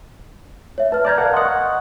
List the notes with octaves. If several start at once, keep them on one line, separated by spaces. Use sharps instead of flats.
C#5 E5
B4 A5 F6
D5 A5 A#5 F6 G6 G#6
A#4 F5 F#5
D#5 F#5 C6 D#6
C#6